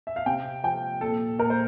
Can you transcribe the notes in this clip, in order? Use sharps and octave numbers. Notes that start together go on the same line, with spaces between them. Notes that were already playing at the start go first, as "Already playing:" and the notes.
E5
F5
C3 G5
F3 G5
A#2 A4
A#2 A#4
C5